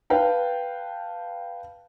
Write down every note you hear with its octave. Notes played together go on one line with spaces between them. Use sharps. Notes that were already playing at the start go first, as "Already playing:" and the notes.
B4 F5 G5 A5